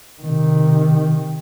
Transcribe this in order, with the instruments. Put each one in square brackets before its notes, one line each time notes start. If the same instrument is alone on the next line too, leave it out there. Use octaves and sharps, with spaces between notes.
[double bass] C3 D#3